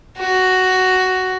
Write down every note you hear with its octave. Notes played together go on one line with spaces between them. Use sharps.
F#4